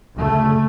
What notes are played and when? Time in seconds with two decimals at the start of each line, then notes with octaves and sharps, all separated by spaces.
0.16 D2 C#3 A3